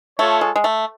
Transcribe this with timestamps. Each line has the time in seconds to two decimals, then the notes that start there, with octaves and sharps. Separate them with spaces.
0.19 A3 F4 A4 C#5
0.41 G#3
0.56 G#3
0.64 A3